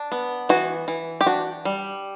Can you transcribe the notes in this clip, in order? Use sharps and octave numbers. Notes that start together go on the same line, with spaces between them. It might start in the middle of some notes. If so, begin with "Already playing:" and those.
Already playing: D4
B3
E3 F#4
E3
G4
D4 F#4
G3